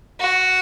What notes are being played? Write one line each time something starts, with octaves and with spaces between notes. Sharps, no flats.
F#4